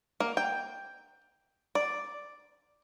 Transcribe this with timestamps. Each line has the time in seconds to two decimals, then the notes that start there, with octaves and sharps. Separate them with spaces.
0.20 A#3
0.37 G5
1.75 D5